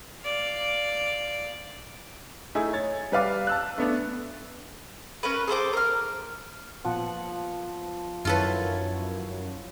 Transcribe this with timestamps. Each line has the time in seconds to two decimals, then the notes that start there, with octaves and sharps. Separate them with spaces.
0.22 D5 F5
2.55 A3 D#4 E4 G#4
2.73 C#5 A6
3.12 G3 B4 F5 D6
3.47 A5 E6 F#6
3.78 A3 B3 D4
5.23 C#4 A#4 B4
5.48 G#4 A4 C5 D6
5.73 A#4 F6
6.85 A#2 F3 B3 F#5
8.25 F#2 D#3 E4 F4 A4 B4 C#5